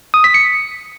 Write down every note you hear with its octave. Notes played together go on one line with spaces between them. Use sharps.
D#6
B6
C#7